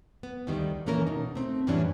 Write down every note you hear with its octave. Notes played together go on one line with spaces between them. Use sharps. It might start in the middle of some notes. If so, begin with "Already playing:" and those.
B3
D2 D#3 G3
A#2 E3 A#3 C#4 A4 A#4
B2 D#4
A3 C4
F#2 A2 E3 G3 C#4 D4